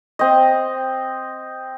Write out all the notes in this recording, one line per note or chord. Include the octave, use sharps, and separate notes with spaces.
C4 D#5